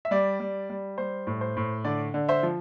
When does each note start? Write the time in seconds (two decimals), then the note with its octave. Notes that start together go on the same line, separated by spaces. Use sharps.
0.05 E5
0.11 G3 D5
0.40 G3
0.70 G3
0.98 G3 C5
1.27 A2
1.41 C5
1.57 A2
1.85 D3 D5
2.14 D3
2.29 C5 E5
2.43 F3